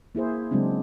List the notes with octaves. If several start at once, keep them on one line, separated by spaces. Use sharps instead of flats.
A#3 E4 G#4 C5
C#3 F#3 G#3 C4 D4